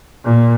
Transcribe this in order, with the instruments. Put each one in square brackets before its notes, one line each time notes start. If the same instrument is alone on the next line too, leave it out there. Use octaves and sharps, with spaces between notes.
[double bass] A#2